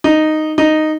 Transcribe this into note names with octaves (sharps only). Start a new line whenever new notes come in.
D#4
D#4